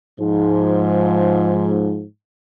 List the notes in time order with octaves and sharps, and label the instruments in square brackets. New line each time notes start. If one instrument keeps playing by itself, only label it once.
[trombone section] G#2 F3